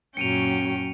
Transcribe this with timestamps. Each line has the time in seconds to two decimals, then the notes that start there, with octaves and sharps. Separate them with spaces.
0.17 F#2 A#2 F#3 C#4 G5 C#7 D#7 F7